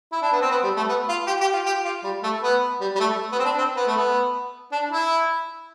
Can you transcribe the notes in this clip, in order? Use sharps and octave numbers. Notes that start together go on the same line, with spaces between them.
E4
D4
B3
C4
B3
G3
A3
B3
F4
G4
G4
F4
G4
F4
G3
A3
B3
G3
G3
A3
B3
C4
D4
C4
B3
A3
B3
D4
E4